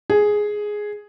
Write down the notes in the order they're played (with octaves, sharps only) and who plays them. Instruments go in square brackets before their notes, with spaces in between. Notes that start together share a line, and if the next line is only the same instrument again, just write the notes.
[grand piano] G#4